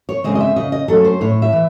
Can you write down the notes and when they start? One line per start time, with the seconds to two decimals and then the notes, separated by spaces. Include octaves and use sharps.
0.09 C#5
0.24 C#3 G#3 C4 D#5
0.35 D#5
0.40 E5
0.56 C#3 D#5
0.72 D#5
0.88 F#3 A3 C#4 A4
1.05 C5
1.21 A2 C#5
1.42 E5
1.52 E3